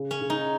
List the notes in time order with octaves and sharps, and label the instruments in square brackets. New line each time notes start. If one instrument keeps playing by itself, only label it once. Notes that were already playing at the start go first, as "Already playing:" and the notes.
Already playing: [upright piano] C#3
[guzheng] C#4
[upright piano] C#3
[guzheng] D#4